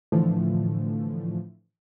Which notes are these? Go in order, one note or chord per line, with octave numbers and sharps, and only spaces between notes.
A2 D3 E3 F3 A3